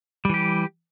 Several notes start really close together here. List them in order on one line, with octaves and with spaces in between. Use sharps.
G3 E3 G4